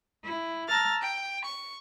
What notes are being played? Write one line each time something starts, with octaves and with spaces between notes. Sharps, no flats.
E4
A5 A#5 E6 F6 A6
G5
C#6